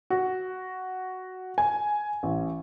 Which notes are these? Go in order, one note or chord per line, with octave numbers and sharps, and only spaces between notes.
F#4
G#5
A1